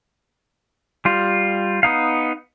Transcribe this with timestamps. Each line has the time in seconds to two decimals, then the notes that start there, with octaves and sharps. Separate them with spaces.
1.05 G3 F4
1.83 B3 D#4 F5